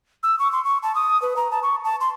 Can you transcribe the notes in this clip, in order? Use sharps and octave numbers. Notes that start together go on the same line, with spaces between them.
E6
C#6
C6
C#6
A5
D#6
B4
A#5
A5
C#6
A5
C6